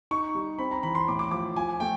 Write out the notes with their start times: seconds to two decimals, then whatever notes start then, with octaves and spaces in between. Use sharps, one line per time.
0.11 D#4 C#6
0.35 G3
0.58 C4 B5
0.71 A#5
0.83 E3 B5
0.95 C6
1.08 A2 D6
1.19 D6
1.31 F3 D6
1.56 F3 G#5
1.80 A3 G5